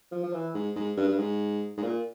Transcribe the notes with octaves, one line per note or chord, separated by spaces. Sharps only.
F3
F3
E3
G#2
G#2
G2
G2
G#2
G#2
A#2